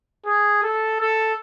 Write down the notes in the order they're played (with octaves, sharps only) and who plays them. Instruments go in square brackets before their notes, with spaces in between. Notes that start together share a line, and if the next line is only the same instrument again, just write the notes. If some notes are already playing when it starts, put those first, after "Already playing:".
[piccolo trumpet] G#4
A4
A4